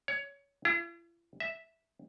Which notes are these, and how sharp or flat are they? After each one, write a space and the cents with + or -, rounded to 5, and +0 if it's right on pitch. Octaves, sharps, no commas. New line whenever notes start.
C#5 +20
E4 +45
E5 -5